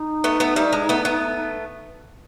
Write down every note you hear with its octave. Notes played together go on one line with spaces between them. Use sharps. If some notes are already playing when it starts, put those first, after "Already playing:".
Already playing: D#4
A3 B3
A3 B3
G3 A3
G#3
A3 B3
A3 B3